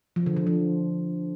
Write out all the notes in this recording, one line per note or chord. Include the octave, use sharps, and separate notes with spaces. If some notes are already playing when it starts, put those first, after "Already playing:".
F3
D3
D3
F3